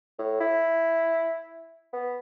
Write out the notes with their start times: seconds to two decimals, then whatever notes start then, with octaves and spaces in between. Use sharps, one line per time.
0.18 A2
0.41 E4
1.93 B3